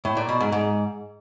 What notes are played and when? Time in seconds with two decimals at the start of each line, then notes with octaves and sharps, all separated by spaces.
0.05 A2
0.17 A#2
0.29 B2
0.41 G#2
0.52 G#2